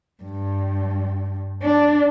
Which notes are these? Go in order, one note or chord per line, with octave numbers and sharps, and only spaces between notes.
G2
D4